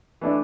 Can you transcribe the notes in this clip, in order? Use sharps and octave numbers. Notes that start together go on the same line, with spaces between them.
E3 A3 D4